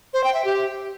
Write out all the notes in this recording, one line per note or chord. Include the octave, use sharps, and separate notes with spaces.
C5
G5
E5
G4